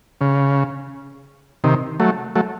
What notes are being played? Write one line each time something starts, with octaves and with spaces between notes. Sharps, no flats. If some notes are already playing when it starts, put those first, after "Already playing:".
C#3
C3 D#3
F#3 A3
F#3 A3